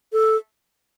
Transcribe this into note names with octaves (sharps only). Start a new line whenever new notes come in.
A4